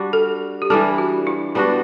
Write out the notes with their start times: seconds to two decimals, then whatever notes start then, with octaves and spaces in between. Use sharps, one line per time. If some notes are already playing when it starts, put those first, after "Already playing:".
Already playing: G3 D4 F#4
0.13 A4
0.62 G4
0.70 E3 G3 D4 A4
0.98 F#4
1.27 E4
1.55 G3 B3 D4 E4 F#4